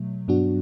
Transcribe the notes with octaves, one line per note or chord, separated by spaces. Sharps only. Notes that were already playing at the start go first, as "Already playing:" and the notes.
Already playing: B2 F#3 A3
G2 F#3 B3 D4 F#4